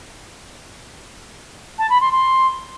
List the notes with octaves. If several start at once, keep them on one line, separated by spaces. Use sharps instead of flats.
A5
B5
C6
C6